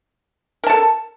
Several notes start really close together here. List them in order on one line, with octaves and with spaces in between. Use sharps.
A#4 A5 A4